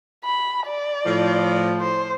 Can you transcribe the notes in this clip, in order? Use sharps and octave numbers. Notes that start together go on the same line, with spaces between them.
B5
D5
A2 F3
C5